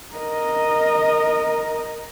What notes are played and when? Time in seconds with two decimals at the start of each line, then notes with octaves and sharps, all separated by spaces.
0.16 A#4 D#5